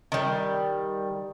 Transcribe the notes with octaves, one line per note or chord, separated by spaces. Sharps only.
D#3 G3